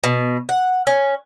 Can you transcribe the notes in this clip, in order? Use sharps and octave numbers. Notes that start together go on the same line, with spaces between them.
B2
F#5
C#4